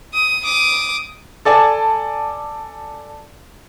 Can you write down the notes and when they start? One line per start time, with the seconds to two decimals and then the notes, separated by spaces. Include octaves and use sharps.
0.14 D#6
0.45 D6 D#6
1.45 A4 D5 G#5 A5